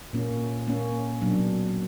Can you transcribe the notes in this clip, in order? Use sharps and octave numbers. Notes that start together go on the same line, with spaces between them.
A#2 A#3 C#4
A#2 A#3 C#4
B2 F#3 A#3 D4